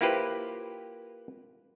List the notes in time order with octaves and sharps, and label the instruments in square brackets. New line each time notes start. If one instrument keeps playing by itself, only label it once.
[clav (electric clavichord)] A#3 E4 F4 G4 B4 C5